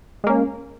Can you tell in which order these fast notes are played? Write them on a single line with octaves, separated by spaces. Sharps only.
G#3 A#3 C#4